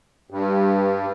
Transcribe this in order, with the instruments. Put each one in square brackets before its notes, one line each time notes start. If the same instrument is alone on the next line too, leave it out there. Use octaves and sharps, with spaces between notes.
[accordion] G2